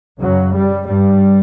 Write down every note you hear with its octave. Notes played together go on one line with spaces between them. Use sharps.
F#2 C#3 F#3
G3
G2 G3